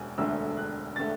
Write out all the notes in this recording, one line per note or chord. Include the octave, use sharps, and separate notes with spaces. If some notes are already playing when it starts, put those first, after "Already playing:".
Already playing: E1 D2 D3 G#5
E1 D2 D3 A3 E6
F#6
D3 A3 A6